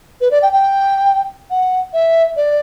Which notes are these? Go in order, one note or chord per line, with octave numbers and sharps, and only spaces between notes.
B4
D5
G5
G5
F#5
E5
D5